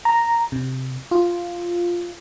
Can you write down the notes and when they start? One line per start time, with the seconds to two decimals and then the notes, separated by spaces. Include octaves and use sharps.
0.05 A#5
0.52 C3
1.11 F4